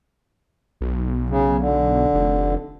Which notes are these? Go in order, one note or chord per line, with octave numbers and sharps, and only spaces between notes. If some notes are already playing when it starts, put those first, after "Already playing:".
B1
C#3
D3
F1